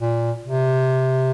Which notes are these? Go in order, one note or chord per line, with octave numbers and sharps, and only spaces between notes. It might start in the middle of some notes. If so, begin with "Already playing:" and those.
A#2
C3